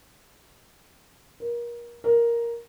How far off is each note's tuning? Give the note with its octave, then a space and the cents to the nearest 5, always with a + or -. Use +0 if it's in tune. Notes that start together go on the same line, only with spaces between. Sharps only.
A#4 +30
A#4 +5